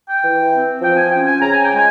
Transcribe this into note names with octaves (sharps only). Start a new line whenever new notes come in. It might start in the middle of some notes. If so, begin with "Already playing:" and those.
G5
E3
C4
F3 G5
G#5
C#4 G5
G#5
C#3 A#5
G#5
G5
G#3
G#5